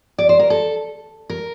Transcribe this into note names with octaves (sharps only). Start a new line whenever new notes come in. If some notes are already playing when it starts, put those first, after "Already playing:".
D5
C5
A#4
A4
A#4